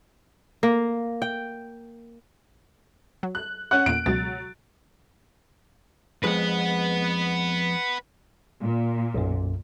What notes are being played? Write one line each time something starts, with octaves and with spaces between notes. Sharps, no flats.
A#3
G5
F#3
F#6
C#4 F#5 F#6
E2 A#2 D7
C#2 B2 F#3 G#3 A6
F2 G#3 B4 F#5
A#2
B1 F#2